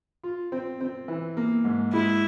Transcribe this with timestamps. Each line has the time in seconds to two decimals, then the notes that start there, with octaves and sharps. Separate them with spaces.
0.23 F4
0.52 C4
0.81 C4
1.08 E3
1.37 A#3
1.64 G#2
1.93 G#3 E4